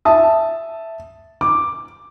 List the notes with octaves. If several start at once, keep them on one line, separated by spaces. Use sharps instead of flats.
E5 A5 D#6
D6